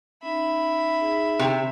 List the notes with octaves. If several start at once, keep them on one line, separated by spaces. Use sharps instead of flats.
C#4 D#4 E5 B5
D#4 G#4
C3